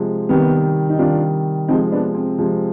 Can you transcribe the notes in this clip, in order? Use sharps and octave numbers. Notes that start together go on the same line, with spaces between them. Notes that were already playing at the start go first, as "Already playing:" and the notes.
Already playing: C3 F3 G#3
C3 D#3 G3 B3
D#4
C3 D#3 G3 D4 F4
C3 F3 G#3 C4 D#4
B3 D4
C4
C3 F3 G#3